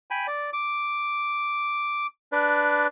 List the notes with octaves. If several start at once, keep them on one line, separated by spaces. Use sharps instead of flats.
G5 G#5 B5
D5
D6
D4 B4 D5